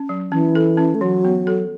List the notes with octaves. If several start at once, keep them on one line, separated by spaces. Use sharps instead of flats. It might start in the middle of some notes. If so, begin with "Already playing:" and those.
Already playing: C#4
F#3
E3 C#4
A4
C#4
A3
E3 F#3
B3
A4